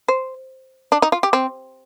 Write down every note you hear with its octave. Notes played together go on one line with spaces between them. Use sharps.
C5
D4
D#4
F4
G4
C4